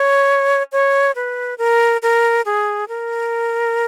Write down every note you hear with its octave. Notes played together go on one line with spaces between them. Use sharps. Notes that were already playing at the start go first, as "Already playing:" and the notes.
Already playing: C#5
C#5
B4
A#4
A#4
G#4
A#4